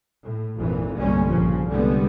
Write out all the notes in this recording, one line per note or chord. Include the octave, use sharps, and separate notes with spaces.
A2
G#1 F2 A#2 E3
G1 C2 G3 G#3 A#3 C#4
A#1 C#3 F3
C2 D3 G3 G#3 B3